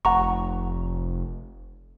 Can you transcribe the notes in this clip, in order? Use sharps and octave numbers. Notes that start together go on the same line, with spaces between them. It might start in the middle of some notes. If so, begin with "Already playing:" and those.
F1 F#5 A#5 C#6